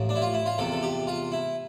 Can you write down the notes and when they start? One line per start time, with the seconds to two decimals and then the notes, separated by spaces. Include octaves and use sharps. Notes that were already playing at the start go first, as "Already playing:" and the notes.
Already playing: A1 A2 F3
0.09 D4
0.15 E4
0.22 F4
0.34 E4
0.46 F4
0.58 E2 C3 F3 A4
0.72 A4
0.82 G4
1.07 F4
1.32 E4